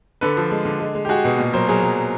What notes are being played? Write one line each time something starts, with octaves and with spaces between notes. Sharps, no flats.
D3 A4 B4
F3
G#3
D3
G#3
G#3
G4
G#3 F#4 G#4
B2
A#2
F#3 A#4 C5
F#3 G#4 A#4
F#3